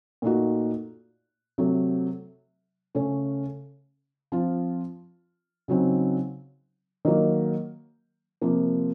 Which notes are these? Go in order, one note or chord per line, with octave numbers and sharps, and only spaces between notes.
A#2 A3 D#4 F#4
C3 F#3 A3
C#3 A3 C#4
F3 C4 F4
C#3 F#3 C4 D#4
D#3 F#3 A#3
C3 F3 A#3